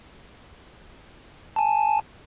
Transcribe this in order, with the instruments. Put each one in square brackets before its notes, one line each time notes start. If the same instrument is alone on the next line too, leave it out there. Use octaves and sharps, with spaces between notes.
[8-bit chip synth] G#5 A5